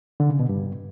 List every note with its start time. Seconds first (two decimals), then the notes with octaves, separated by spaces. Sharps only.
0.20 D3
0.30 C#3
0.39 B2
0.49 G2